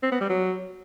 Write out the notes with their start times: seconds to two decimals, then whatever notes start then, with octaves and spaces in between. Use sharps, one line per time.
0.03 C4
0.12 B3
0.21 G3
0.30 F#3